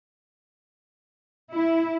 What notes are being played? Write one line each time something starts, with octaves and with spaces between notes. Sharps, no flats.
E4